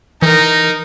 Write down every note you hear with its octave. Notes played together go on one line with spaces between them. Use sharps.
E3 D#4 A#4